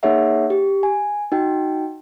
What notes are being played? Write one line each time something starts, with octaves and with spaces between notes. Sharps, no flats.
A#3 D#4 G#4 C#5 E5 F#5
G4
G#5
D#4 F#4 G5